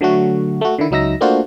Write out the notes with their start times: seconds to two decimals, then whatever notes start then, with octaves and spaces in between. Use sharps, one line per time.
0.01 D3 F#3 A3 F#4
0.61 A3 F#4
0.79 D3 D#3 E4
0.91 C#2 F#3 D#4 E5 E6 A#6
1.21 A3 A#3 D4 F4 F#4 C5